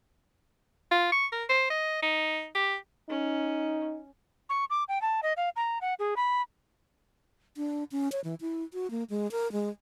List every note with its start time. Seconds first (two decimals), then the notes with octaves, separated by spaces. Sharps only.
0.91 F4
1.12 C#6
1.32 A#4
1.50 C5
1.70 D#5
2.02 D#4
2.55 G4
3.09 C#4 D#4
4.49 C#6
4.70 D6
4.88 G5
5.01 A5
5.23 D#5
5.37 F5
5.56 A#5
5.81 F#5
5.99 G#4
6.16 B5
7.57 D4
7.92 C#4
8.12 C#5
8.24 E3
8.41 E4
8.73 F#4
8.91 A#3
9.10 G#3
9.32 A#4
9.52 G#3